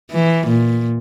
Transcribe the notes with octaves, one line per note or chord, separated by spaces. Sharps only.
E3
A#2